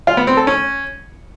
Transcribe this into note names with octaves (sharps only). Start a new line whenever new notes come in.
F4
B3
C4
A4
C#4